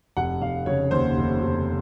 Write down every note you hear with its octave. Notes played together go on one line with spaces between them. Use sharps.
F1 F#5
F1 F5
C#3 C#5
D#2 C5
F1
F1